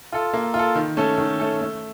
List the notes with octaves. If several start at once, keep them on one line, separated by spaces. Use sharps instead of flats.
F4 A4
A#3
F4
A4
D#3
A3 C#4 A4
D#3
A3 C#4 A4
A3